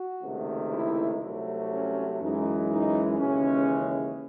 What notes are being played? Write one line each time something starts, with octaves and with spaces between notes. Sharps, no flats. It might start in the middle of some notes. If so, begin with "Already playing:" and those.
Already playing: F#4
C#2 C3 D#3 A3
E4
C2 C3 F#3 A3
C#4
F#2 E3 G#3 D#4
D#4
D#2 C#3 E3 G#3 C#4